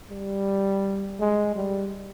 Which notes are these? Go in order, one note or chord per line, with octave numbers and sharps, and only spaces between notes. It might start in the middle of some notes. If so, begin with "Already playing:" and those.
G3
G#3
G3